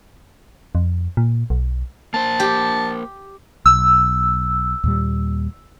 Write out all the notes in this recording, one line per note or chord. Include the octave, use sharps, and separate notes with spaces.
F2
A#2
B1
A#3 C5 A5
G4
B1 E6
D#2 A#2 G3